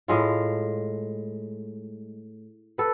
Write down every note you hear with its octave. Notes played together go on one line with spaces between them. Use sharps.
A2 G#3 F4
A4 B4